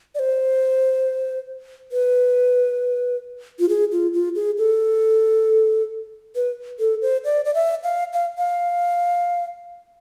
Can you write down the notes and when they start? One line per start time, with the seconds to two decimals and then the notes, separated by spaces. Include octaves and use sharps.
0.15 D5
0.19 C5
1.92 B4
3.59 F4
3.69 G#4
3.92 F4
4.14 F4
4.35 G#4
4.58 A4
6.35 B4
6.80 A4
7.02 C5
7.24 D5
7.45 D5
7.54 E5
7.83 F5
8.13 F5
8.38 F5